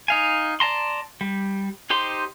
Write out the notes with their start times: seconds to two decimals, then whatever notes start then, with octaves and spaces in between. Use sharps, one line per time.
0.08 D#4 F5 G#5
0.60 D5 A5 A#5 C6
1.21 G3
1.90 D#4 G4 C5 C6